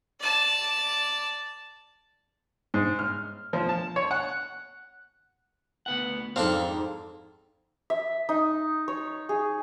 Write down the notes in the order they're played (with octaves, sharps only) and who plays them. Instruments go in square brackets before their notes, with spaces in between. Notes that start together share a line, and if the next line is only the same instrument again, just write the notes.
[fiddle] D5 A5
[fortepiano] G#2
F6
F3
A5
C#5
F#5
[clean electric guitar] D2 B3 F#5
[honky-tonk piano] F2 G#2 [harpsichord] C4 D4 A4 [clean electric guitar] F5
[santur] E5
D#4
C#5
G#4